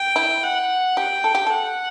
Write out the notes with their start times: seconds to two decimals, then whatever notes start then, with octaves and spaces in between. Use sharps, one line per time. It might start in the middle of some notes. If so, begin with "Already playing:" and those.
Already playing: G5
0.16 E4
0.43 F#5
0.97 G4 G5
1.24 A4
1.35 G4
1.47 A4 F#5